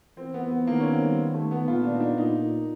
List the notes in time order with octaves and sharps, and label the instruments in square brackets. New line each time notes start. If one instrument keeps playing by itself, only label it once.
[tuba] E3 [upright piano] C4
[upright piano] B3
B3
[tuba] D#3 [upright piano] A#3
[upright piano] C#4
C4
G3
A3
B3
[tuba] A#2 [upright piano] F4
[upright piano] D4
D#4
D4
[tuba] A#2 [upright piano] D#4